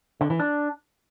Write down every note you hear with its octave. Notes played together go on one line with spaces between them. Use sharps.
D3
E3
D4